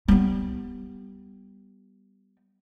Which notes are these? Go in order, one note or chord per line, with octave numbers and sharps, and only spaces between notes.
G3 B3